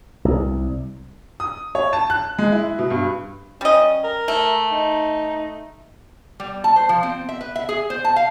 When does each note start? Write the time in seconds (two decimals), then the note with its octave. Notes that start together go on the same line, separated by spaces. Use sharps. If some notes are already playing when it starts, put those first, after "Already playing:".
0.25 C2
1.40 D#6
1.75 C#5
1.93 A5
2.10 F#6
2.39 G#3
2.52 E4
2.79 B2
2.90 G2
3.61 G3 C#4 D#5
4.04 A#4
4.28 A3
4.71 D#4
6.40 G3
6.64 A5
6.76 C5
6.89 F3
7.03 C4
7.29 E5
7.41 B4
7.56 E5
7.69 G#4
7.90 C5
8.04 A5
8.16 F5